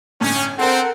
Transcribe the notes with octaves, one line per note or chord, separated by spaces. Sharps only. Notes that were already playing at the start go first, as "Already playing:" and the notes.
G1 A2 C#4
C4 A4 A#4 F#5